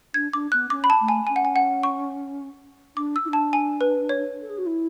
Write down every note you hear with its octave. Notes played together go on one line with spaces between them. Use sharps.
D4 G#6
D4 D6
B3 F#6
C#4 D6
B5
A5
A3
G#5
C#4 G#5
F#5
G#5
F#5
C#6
D4 D6
E6
E4
D4
A5
G#5
B4
C#5
A4
G#4
F#4
E4